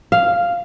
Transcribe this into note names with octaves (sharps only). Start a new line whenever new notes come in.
F5